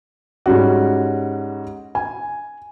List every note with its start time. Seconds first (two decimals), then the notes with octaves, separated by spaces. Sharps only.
0.46 G#2 G3 C#4 F#4
1.95 G#5